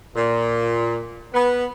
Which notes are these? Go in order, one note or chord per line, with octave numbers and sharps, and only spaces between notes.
A#2
B3